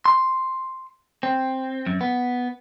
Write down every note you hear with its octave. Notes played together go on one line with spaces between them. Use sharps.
C6
C4
F#2
B3